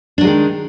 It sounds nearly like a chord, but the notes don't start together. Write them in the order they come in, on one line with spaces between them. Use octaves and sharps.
D4 F#3 G#3 D#3